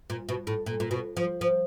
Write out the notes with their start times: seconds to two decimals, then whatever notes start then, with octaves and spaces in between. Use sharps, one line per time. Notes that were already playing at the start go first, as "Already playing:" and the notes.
0.10 A#2
0.29 B2
0.47 A2
0.66 A#2
0.80 A#2
0.91 B2
1.17 F3
1.41 F3